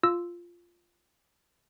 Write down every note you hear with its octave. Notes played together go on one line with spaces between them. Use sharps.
F4 E6